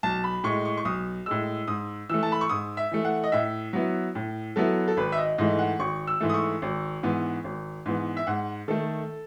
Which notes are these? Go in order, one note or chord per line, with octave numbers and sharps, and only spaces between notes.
B1 A5
B5
A2 G#3 C#6
C#6
C#6
B1 D#6
A2 G#3 E6
G#2 D#6
E3 A3 E6
A5
B5
C#6
G#2 D#6
E5
E3 A3
F#5
D#5
A2 E5
F#3 B3 E4
A2
F#3 B3 E4 A4
A4
G#1 B4
E5
D#5
G#2 E3 A3 D#5
F#5
G#1 C#6
E6
G#2 E3 A3
D#6
C#6
G#1
G#2 E3 B3
G#1
G#2 E3 B3
E5
G#2 F#5
D#3 A3 A4